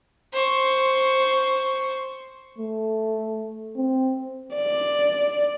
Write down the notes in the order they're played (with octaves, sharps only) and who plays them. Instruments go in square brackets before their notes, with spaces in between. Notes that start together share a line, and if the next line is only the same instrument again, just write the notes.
[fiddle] C5 C#6
[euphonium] A3
C4
[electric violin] D5